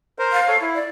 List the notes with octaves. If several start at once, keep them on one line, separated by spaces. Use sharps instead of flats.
A#4 C5
F5
A4 C#5
E4
D5